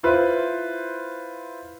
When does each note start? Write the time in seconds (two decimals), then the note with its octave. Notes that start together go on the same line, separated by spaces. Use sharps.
0.03 E4 F4 B4 C5